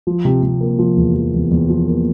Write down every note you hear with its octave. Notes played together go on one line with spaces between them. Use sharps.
F3
C3
C3
A#3
F3
E2
F3
E2
E2
F3
A#3